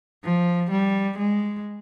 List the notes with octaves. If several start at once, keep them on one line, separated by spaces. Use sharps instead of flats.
F3
G3
G#3